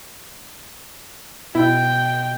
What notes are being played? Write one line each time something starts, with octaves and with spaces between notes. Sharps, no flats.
B2 E4 G5